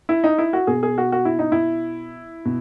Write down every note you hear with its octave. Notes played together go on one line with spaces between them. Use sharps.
E4
D#4
E4
F#4
B2 G#4
G#4
F#4
F#4
E4
D#4
E4
B2